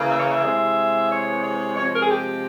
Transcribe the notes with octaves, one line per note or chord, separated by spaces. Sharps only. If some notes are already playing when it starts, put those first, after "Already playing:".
Already playing: C#3 E3 A#3
E5
C#5
E5
C3 E3 G#3
C#5
C#5
C3 F3 G#3 C#5
A#4
G#4
G4